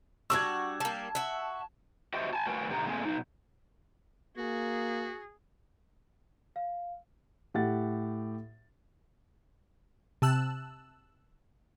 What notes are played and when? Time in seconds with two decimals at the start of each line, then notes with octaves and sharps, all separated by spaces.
0.30 G3 D4 F#4 C#6 E6 G#6
0.80 G3 A#3 A5
1.15 F#4 E5
2.14 F#4 G4 C5 D#5 E5 G5
2.33 G#5 A5
2.46 A3 F#4 A#4 B4 G5 G#5
2.69 G#2 B2 D3 G4 G#5 A#5
2.85 A#2 G#3 A3 C4 G#5
3.05 B2 F#3 D#4
4.37 A#3 F#4 G#4
6.56 F5
7.54 A2 G4 F#5 A6
10.22 C3 A5 E6 F#6